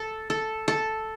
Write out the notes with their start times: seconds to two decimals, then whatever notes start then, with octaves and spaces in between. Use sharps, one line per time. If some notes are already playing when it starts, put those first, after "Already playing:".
Already playing: A4
0.30 A4
0.68 A4